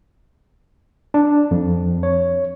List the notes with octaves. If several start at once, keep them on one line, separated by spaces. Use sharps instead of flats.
D4
F2
C#5